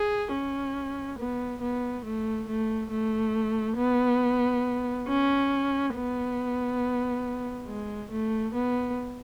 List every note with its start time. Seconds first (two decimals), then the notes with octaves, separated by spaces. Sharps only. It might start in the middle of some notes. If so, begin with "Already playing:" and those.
Already playing: G#4
0.32 C#4
1.19 B3
1.62 B3
2.05 A3
2.49 A3
2.91 A3
3.78 B3
5.08 C#4
5.95 B3
7.68 G#3
8.11 A3
8.54 B3